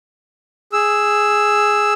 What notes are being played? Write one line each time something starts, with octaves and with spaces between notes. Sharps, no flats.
G#4 E6